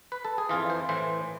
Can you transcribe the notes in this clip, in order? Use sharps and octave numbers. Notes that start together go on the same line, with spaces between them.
B4
A4
G#4
F2 E3 F4
C5
A2 E3 C5